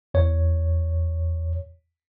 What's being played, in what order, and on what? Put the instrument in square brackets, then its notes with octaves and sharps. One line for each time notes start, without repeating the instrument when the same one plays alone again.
[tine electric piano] E2 C#5